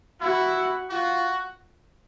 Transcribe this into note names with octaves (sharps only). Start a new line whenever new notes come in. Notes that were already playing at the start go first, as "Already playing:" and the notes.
E4 F#4
F4 F#4